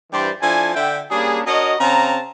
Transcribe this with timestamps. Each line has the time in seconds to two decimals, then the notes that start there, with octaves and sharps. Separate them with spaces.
0.12 G2 E3 G3 G4 C5 D5
0.42 F3 D4 E4 A4 G#5
0.75 D3 E5 G5
1.11 G3 A#3 C#4 D4 G#4
1.46 D4 F#4 A#4 C#5 D#5
1.80 C#3 C4 A5 A#5